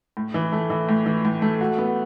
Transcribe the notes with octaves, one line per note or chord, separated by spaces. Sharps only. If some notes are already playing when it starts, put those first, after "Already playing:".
A2
E3
A3
E3
A2
E3
A2
A3
F#4
B3